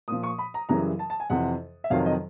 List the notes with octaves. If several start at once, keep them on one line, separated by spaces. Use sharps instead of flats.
A#2 F3 D#6
C#6
B5
A#5
F#2 C#3 E3 G3 A#5
A5
A5
G#5
F2 C3 E3 F#5
E5
F2 C3 D#3 F#3 F5
D#5